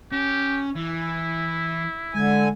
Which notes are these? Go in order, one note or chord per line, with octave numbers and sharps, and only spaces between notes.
C#4 G4
E3 E4
D3 G#3 G#5